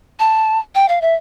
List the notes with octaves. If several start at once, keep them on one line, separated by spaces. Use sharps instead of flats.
A5
G5
F5
E5